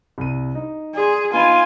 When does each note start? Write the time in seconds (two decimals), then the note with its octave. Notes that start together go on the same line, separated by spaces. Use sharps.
0.18 C2 D#7
0.55 D#4
0.95 G#4 D5 C6
1.33 B3 D#4 F4 G#5 B5